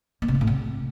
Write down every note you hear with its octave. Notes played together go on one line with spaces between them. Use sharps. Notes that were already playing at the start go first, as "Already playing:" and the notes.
A#3
C3
G2
A2
C3